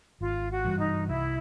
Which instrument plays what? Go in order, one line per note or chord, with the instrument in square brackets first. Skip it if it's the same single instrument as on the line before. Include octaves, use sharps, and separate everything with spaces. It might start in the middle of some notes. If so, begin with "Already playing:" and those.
[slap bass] G#1 [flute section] F4
[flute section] F#4
[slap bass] G2 E3 G3
[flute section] D#4
[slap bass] C2 [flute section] E4